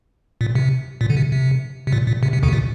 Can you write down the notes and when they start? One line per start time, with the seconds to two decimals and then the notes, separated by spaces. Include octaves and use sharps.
0.41 A#2
0.55 C3
1.01 A#2
1.10 D3
1.17 C3
1.32 C3
1.87 C3
1.92 A#2
2.07 A#2
2.23 C3
2.33 C3
2.43 D2 D3
2.48 C3
2.53 A#2